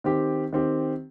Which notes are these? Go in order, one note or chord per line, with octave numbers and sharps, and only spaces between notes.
D#3 C4 G4
D#3 C4 G4